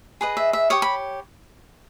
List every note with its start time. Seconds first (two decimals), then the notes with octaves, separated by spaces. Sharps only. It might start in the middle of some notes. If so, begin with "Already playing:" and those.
0.21 G#4 B4 D#5
0.37 E5
0.53 E5
0.70 G4 C#5 D#6
0.82 B5